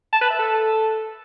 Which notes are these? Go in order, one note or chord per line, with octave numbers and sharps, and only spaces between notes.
A5
B4
E5
A4